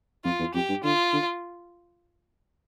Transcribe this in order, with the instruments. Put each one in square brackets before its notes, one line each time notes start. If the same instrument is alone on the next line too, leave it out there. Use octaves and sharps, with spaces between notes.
[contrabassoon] F2 [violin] F4
[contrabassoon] E2
[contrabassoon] F2 [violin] G4
[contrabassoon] G2
[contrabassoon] D3 [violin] F4
[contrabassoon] D3